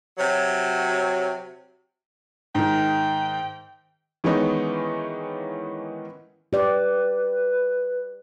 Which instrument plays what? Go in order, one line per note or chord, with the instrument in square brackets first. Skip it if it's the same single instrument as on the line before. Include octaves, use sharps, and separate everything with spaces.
[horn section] C3 F#3
[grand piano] G#2 D#3 [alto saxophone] G5
[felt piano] D#3 E3 G#3 B3 C#4 D#4
[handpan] G4 D5 [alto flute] B4